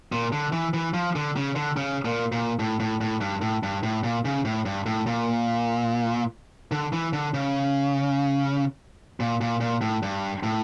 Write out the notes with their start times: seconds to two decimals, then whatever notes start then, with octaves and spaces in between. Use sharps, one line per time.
0.12 A#2
0.32 D3
0.53 E3
0.74 E3
0.94 F3
1.16 D3
1.36 C#3
1.56 D3
1.77 C#3
2.05 A#2
2.32 A#2
2.59 A2
2.80 A2
3.01 A2
3.21 G2
3.41 A2
3.63 G2
3.83 A2
4.04 A#2
4.25 C#3
4.45 A2
4.66 G2
4.86 A2
5.07 A#2
6.72 D3
6.93 E3
7.13 D3
7.34 C#3
9.20 A#2
9.41 A#2
9.61 A#2
9.81 A2
10.03 G2
10.43 A2